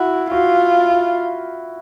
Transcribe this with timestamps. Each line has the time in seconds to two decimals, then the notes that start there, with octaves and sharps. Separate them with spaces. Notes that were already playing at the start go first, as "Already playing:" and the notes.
Already playing: E4 F#4
0.31 F4 F#4